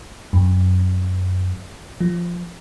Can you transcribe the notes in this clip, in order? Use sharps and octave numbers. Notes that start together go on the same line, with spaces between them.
F#2
F3